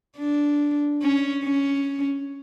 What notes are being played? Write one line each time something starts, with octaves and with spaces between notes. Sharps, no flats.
D4
C#4
C#4